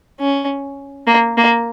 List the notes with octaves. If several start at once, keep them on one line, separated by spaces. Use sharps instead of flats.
C#4
A#3
A#3